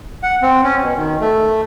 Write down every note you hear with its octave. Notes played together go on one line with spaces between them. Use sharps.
F#5
C4
C#4
B2
D#3
A3